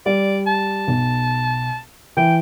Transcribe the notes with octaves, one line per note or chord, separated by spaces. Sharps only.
G3 D5
A5
B1
E3 G5